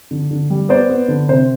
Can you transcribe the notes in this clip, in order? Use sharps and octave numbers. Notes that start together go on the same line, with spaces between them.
D3
D3
G3
B3 C5 D5
B3
D3
C3 C5